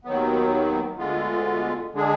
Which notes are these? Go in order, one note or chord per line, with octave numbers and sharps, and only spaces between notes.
D#2 D#3 F#3 B3
D2 D3 G#3 B3 F4
D3 G#3 D4 G#4